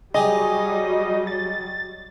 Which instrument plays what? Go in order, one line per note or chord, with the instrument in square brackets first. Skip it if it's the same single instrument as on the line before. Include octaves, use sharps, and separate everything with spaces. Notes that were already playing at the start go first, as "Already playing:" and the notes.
[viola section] F#3 G3 [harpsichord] D#4 G4 G#4 [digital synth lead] D#5
[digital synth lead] A6